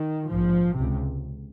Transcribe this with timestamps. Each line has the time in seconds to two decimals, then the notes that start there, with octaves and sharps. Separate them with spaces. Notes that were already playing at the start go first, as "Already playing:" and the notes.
Already playing: D#3
0.29 A#1 G#2 F3
0.77 C#2 C3